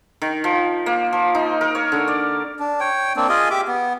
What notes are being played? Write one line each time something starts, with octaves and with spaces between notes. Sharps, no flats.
D#3
F3
A#3
F3
D#4
A#4
C#5
D3
D5
D4
C#5 G5
A#3 C4 D4
F4 G#4 D#5 G#5
G4 E5 D6
B3